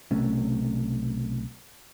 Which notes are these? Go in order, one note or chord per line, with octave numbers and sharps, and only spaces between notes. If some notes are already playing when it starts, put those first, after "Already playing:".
B1 C3 A3 C#4